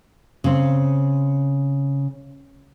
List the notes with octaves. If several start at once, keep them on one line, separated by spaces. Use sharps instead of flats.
C#3 C4